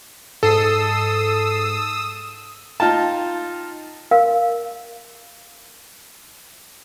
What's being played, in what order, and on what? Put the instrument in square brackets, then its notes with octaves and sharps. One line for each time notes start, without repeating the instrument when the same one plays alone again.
[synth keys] G#2 C7 [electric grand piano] A4 [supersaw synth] D#6 E6
[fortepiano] D#4 F4 G5 A5
[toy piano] A#4 F5